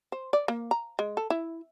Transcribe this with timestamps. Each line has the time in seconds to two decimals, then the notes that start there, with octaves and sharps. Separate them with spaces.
0.12 C5
0.33 D5
0.48 A#3
0.71 A#5
0.99 G#3
1.17 A4
1.30 E4